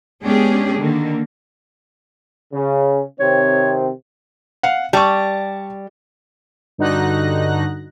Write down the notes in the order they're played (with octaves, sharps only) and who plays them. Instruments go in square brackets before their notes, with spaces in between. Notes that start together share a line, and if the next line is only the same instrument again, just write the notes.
[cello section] G#3 B3 C#4 D4 G4 G#4
D3 D#3 A#3
[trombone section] C#3
[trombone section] C3 D#3 C4 [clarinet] C#5
[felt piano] F5 F#5
[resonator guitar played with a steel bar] G3 [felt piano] A5 C#6
[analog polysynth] G2 D3 D#4 F#4 F#6 A#6